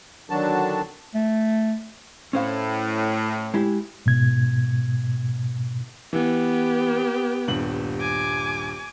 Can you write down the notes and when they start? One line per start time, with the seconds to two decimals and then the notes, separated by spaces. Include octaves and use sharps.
0.30 D3 D#3 F#3 D4 F#4 A5
1.14 A3
2.33 A2 C#4 C5 F5
3.54 G#3 E4 G4
4.06 G#2 B2 G#6
6.13 E3 B3 G4
7.48 D#1 G2 F#7
8.00 G#5 D6